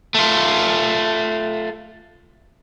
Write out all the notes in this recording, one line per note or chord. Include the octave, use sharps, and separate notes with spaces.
A3 F4